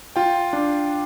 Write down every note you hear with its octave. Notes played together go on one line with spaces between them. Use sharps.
F4 G5
D4